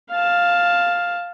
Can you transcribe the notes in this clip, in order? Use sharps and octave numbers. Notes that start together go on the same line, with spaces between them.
F5 A5